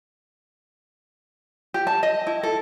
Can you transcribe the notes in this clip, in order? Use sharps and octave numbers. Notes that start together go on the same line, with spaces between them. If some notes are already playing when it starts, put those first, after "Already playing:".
G4
A5
D#5
E4
A4